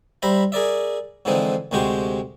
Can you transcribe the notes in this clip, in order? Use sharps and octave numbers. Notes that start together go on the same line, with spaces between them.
G3 C5 E5 A#5 B5
G#4 A#4 D5 E5
G#2 D3 E3 F3 C4 D#4
D2 C3 G#3 F#4 G4 C5